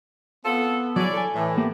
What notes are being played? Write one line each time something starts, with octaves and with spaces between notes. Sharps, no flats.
B3 C4 F4 A4
F#3 E4 F#4 G#4 C#5 D5
A4 G#5
A2 E3
A#3 B3 G4 A#4